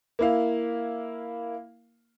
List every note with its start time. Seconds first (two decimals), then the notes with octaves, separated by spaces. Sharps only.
0.19 A#3 E4 F5